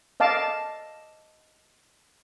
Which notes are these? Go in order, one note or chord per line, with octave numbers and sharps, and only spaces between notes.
D#5 F5 A5 D6